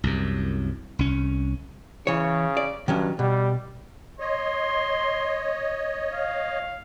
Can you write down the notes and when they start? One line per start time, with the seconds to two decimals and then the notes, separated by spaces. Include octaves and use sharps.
0.04 C2 F#2
0.99 C2 C#4
2.07 C#3 E3 C#5
2.57 D5
2.88 G2 D#3 F#3 C#4
3.19 B2 G3
4.20 C#5 D#5 C6
6.14 F5